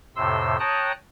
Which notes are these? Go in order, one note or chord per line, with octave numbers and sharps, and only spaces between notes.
F2 A2 C3 C6 E6
C#5 G5 A5 A#5 D#6 F#6